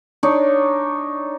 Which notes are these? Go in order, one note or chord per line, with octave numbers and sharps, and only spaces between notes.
D4 D#4 C#5